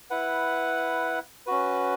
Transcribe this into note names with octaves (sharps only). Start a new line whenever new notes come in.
E4 B4 F#5
C#4 F#4 B4